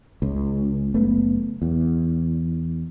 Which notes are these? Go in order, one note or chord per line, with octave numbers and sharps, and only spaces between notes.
C#2
F#1 A3 B3
E2